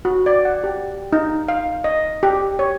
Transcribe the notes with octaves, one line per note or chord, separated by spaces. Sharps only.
F#4
D5
F#5
G4
D#4
F5
D#5
G4
C#5